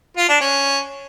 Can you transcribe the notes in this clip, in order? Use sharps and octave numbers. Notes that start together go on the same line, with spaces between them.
F4
D4
C#4